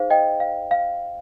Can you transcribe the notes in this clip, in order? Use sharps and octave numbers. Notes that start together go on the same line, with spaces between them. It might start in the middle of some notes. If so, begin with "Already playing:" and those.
Already playing: D#4 G#4 C5 F5
D#5 G5
F5
F5